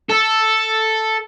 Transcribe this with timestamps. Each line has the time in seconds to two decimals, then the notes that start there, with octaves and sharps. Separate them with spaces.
0.09 A4